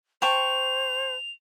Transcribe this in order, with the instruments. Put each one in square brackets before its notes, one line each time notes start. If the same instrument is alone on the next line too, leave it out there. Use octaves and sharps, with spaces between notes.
[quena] C5 [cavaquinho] G5 A5 C#6 [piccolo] F7